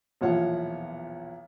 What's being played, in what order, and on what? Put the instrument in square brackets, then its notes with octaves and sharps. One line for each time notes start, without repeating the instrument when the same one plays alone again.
[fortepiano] B1 E2 A#2 F3 C#5 F#5